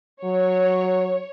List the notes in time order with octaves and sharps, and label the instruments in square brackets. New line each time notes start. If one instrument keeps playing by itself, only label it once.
[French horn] F#3 [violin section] C#5